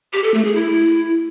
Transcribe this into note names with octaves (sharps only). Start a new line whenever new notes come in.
G4
A4
A3
G#4
E4